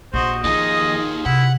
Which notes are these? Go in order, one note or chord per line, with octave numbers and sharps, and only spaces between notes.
A#1 F#4 C5 D#5
D#2 F3 D#4 F4 G#4 D#5
C3 E4 F#5